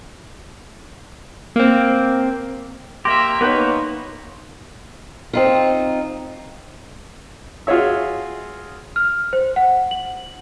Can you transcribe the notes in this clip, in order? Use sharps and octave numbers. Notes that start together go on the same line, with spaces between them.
A#3 C4
A#3 G4 E5 A#5 C6 A#6
A#3 B3 D#4 B4 C#5 G5
C4 D#4 F4
F4 F#4 G#4 C#5 E5
F6
C5
F#5
F#7